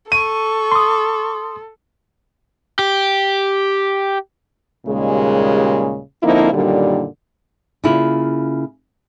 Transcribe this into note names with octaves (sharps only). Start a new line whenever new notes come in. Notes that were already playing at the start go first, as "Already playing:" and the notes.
A4 C#6 D#7
C6 D#6
G4
D#2 A#2 C#3 G3 G#3
D3 F3 A#3 C4 D#4 E4
F#2 A#2 D3 D#3 G3
C#3 A#3 E4 F4